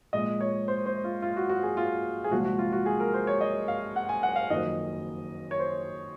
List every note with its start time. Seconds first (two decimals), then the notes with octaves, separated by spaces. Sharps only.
0.13 A#1 A#2 G#3 D#5
0.41 C#5
0.68 C5
0.86 C5
1.04 F4
1.22 F4
1.37 F#4
1.49 F#4
1.63 G#4
1.77 F4
2.24 G#4
2.31 C2 A#2 F3 G#3 F#4
2.45 F#4
2.59 F4
2.72 F#4
2.86 G#4
3.00 A#4
3.14 C5
3.27 C#5
3.41 D#5
3.68 F5
3.96 F#5
4.09 G#5
4.23 F#5
4.36 F5
4.50 F#1 F2 D#3 F#3 D#5
5.51 C#5
5.59 C5